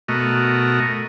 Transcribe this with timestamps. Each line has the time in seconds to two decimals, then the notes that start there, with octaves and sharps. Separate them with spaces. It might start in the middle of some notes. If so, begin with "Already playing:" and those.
0.08 B2 A3 F#4 A#4 D#5